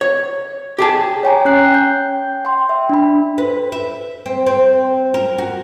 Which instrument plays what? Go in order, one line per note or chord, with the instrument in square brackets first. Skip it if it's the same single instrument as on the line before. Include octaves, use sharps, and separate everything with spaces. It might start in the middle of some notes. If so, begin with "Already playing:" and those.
[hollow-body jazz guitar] C#5
G4 G#4 A5
[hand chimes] C#5 G5 G#5 A#5
C#4 F#6 C7
G5 G6
G5 C6
E5
D4 B5
[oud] B4
E5
C4
C4
A#4
F#4